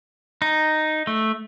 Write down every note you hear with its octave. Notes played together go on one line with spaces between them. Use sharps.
D#4
A3